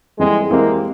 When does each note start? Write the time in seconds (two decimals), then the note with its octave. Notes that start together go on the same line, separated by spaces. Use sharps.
0.19 F2 E3 G3 G#3 C4
0.50 E3 G#3 A#3 C4 G4